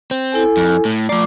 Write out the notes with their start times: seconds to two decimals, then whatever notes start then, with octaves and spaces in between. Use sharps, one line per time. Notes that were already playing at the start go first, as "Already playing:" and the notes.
0.11 C4
0.32 E4 A4 G#5
0.57 F2
0.85 A2
1.09 F3 A3 D5 A#5 D6